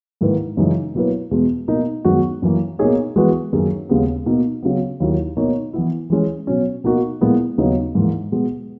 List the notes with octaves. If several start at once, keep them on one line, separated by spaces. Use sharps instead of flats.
G#2 D#3 A#3 E4 B4
F#2 C#3 E3 G#3 D#4
B2 F#3 A#3 E4 B4
E2 B2 G#3
B2 A#3 D#4 A#4
F#2 D#3 G#3 B3 F#4
F#2 E3 A#3
B2 A#3 D#4 G#4 C#5
E3 G#3 B3 F#4 B4
F#2 D#3 A#3 C#4 G#4
D#2 C#3 G#3 B3
B2 A#3 D#4
C#3 F#3 B3
D#2 D#3 F#3 A#3 E4
B2 A#3 D#4 A#4 C#5
E3 B3 E4
E3 G#3 C#4
B2 F#3 C#4
B2 A#3 D#4 F#4 A#4
A#2 G#3 B3 E4 A#4
D#2 C#3 F#3 B3 D#4
G#2 E3 A#3
B2 G#3 B3